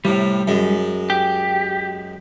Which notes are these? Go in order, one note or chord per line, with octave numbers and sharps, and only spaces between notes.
A2 C3 G3
F#2 G#3
G4